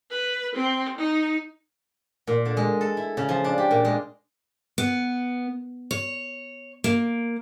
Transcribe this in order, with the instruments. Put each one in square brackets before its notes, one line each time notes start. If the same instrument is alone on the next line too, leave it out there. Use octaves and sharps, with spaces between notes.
[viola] B4
C4
D#4
[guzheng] A#2
D3
G#3
A4
E4
C#3
F3
D4
G4
A#2
G#3
[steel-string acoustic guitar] B3
C#5
A#3